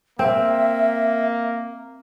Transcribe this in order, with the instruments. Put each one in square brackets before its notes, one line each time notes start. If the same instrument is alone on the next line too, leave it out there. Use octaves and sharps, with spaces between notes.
[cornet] A#3 [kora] C4 [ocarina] E5